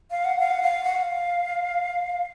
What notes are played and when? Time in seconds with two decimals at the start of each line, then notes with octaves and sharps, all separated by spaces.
0.11 F5
0.25 F#5
0.40 F5
0.51 F#5
0.63 F5
0.84 F#5
0.95 F5